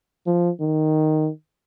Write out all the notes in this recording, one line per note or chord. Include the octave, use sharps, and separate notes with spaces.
F3
D#3